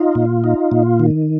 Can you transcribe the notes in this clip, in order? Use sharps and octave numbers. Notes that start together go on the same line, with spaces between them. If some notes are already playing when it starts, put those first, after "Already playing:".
Already playing: D#4 F4
A#2
D#4
A#2
D#3